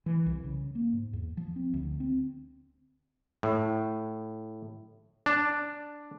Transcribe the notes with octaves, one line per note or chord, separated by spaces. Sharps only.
E3
C2
C#3
A#3
G#2
E2
F3
C4
D2
C4
A2
D4